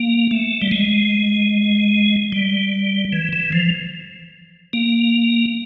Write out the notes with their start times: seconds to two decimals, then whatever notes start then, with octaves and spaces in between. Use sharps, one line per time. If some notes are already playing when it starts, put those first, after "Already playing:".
Already playing: A#3
0.31 A3
0.62 G3
0.71 G#3
2.32 G3
3.13 E3
3.33 E3
3.52 F3
4.73 A#3